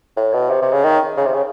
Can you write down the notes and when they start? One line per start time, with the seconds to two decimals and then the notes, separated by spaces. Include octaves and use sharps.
0.16 A2
0.33 B2
0.50 C3
0.62 C3
0.72 C#3
0.84 D#3
1.17 C#3
1.26 C3
1.34 C#3